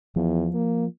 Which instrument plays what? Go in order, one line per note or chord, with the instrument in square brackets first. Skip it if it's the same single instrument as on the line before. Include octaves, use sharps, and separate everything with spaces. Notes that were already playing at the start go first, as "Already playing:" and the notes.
[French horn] E2 [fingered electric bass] F3
[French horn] A#3